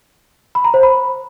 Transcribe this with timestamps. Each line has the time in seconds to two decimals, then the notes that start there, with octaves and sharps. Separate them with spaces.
0.55 B5
0.64 A#5
0.74 C5
0.83 B5